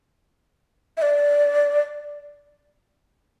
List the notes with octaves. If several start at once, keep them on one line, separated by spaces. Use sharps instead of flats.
E5
D5